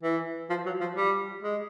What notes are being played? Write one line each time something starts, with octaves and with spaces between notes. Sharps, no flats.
E3
F3
F#3
F3
G3
G#3